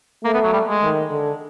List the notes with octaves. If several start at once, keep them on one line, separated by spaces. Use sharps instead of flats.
A3 A#3
B3
F#3
G3
G#3
D#3
D3